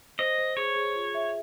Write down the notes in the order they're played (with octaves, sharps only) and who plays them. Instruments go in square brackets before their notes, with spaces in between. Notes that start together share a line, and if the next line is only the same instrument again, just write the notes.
[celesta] C5 [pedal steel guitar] D#5
[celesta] C5
[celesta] G#4 [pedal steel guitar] C#5
[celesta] G#4
F4
E5